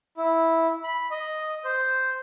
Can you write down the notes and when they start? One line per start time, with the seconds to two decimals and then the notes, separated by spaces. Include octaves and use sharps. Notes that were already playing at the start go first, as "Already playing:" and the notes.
0.17 E4
0.84 B5
1.11 D#5
1.65 C5